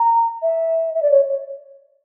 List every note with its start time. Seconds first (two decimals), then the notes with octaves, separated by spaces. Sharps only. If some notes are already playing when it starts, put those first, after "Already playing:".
Already playing: A#5
0.42 E5
0.94 E5
1.02 D5
1.11 C#5